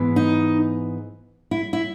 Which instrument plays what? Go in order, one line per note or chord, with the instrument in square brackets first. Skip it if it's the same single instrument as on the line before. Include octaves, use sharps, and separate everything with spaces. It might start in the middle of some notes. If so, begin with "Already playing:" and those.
Already playing: [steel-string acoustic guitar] G#2 E3 B3
D#4
E4
E4